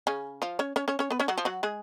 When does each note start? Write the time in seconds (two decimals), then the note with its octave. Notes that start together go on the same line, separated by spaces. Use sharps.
0.07 C#3 C#4
0.42 F3 F4
0.59 C#4 C#5
0.76 C#4 C#5
0.88 C#4 C#5
0.99 C#4 C#5
1.10 B3 B4
1.19 C#4 C#5
1.28 F#3 F#4
1.38 F3 F4
1.45 F#3 F#4
1.63 G#3 G#4